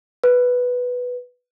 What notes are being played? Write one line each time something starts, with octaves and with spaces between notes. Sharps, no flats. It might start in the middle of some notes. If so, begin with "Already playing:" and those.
B4